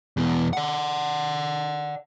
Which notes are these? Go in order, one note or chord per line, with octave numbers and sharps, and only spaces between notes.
E2 B2
D5 F#5